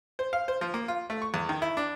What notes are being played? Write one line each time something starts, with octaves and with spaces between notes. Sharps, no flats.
C5
F5
C5
F3
A#3
F4
A3
C#6
E2
D#3
E4
D4